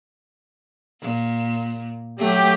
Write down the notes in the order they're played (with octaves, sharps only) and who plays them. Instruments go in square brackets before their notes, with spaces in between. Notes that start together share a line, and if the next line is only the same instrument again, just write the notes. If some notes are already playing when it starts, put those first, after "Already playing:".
[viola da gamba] A#2
[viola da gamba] F#3 A3 [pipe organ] G4